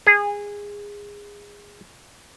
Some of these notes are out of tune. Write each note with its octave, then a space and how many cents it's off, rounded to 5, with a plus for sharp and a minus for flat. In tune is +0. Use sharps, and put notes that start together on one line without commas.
G#4 -20